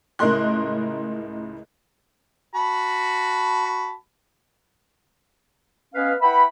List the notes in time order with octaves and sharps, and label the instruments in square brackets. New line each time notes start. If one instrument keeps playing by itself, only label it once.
[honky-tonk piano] C#2 A2 A#4 D#5 C6 F#6
[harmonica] F#4 A5 B5
[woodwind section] B3 C#4 B4 D#5 F5
E4 B4 E5 F#5 G5 B5